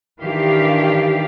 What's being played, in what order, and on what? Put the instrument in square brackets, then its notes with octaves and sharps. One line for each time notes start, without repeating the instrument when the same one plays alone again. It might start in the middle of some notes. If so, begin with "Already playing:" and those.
[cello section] D#3 E3 D4 G4 F5